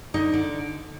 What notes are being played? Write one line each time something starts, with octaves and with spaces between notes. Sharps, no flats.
D3 D#4
D3